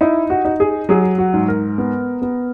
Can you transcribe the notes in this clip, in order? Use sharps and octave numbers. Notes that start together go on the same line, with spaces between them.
D#4 E4
F#4
D#4
G#4
F#3 G#4
F#4
G#2
A#4
B3
B3